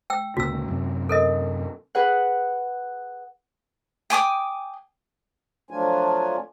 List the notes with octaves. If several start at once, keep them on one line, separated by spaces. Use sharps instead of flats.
G5 E6
D2 A#2 C#3 F#4 E6
F#2 C3
A4 A#4 D#5
G#4 B4 F#5
G5 G#5 D6 D#6
F3 F#3 A3 D4 F4 G#5